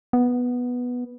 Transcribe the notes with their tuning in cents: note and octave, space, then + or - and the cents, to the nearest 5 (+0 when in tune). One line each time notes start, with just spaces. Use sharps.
B3 -5